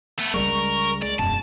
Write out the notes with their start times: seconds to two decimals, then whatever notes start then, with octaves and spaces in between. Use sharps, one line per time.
0.19 A3 B3
0.34 C#2 G3 G#3 A#4 C#6
1.02 G#3 D5
1.19 E1 F#2 A5